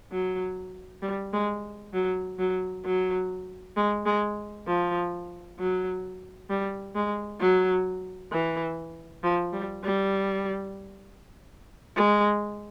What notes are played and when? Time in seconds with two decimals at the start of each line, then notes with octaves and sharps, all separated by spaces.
0.12 F#3
1.02 G3
1.33 G#3
1.93 F#3
2.39 F#3
2.85 F#3
3.76 G#3
4.06 G#3
4.67 F3
5.59 F#3
6.50 G3
6.95 G#3
7.41 F#3
8.32 E3
9.23 F3
9.53 G3
9.84 G3
11.96 G#3